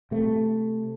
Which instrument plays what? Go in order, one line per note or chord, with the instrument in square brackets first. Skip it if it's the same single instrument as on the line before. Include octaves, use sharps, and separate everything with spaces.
[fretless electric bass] C3 A3